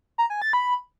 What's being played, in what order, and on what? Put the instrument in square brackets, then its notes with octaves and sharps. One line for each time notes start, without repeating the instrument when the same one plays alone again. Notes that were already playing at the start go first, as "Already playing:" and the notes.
[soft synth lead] A#5
G#5
A6
B5